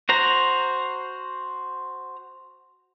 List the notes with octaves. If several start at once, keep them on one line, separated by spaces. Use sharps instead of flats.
F#4 C5 A#5